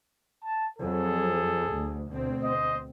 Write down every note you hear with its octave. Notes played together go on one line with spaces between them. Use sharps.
A5
F2 F#3 G#4 A4
D2
D2 B2 C4
C5 D#5